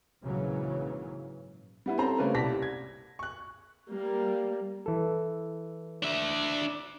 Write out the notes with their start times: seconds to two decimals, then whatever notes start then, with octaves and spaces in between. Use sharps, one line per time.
0.24 A#1 G#2 C#3 E3 F#3
1.86 G3 B3 E4
1.98 C4 C#4 A4 C5 A#5 B5
2.18 C#3 G3 A3 A#3 C#4 B4
2.34 C2 G4 D5 A5 A#6 B6
2.62 G#6
3.19 C#6 F#6
3.89 G3 A#3
4.86 E3 A4
6.03 D4 E5